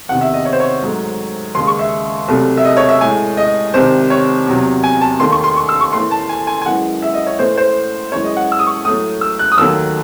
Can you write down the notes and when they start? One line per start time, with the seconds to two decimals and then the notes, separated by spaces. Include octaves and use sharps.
0.09 E2 C3 D#3 F#5
0.21 E5
0.34 D#5
0.45 C#5
0.53 C5
0.60 C#5
0.82 G#2 F#3 A3
1.55 D#2 C#3 G#3 C6
1.67 C#6
1.79 E5
2.28 C2 C3 F#3 A3
2.57 E5
2.64 D#5
2.77 C#5
2.89 E5
3.01 A2 G#3 G#5
3.37 D#5
3.74 C2 C3 D#3 C5
4.10 C#5
4.47 E2 C3 F#3
4.84 G#5
5.01 A5
5.20 D#2 D#3 A3 C6
5.32 C#6
5.44 C6
5.56 C#6
5.69 E6
5.81 C#6
5.93 A2 E3 A3 C6
6.11 A5
6.29 G#5
6.47 G#5
6.62 G#5
6.66 F#2 E3 G#3 F#5
7.02 E5
7.14 D#5
7.27 C#5
7.39 A2 E3 A3 C5
7.57 C5
8.12 F#2 E3 G#3 C#5
8.24 D#5
8.37 F#5
8.52 E6
8.59 D#6
8.67 C#6
8.84 A2 F#3 A3 D#6
9.21 E6
9.39 F#6
9.52 D#6
9.58 D#2 D#3 F#3 A3 E6